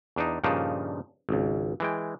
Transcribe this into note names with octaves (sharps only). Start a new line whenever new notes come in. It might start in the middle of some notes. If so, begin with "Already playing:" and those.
E2 D4 D#4
G2 A#2 C#3 F3 D4 D#4
G#1 C#2
E3 G#3 G5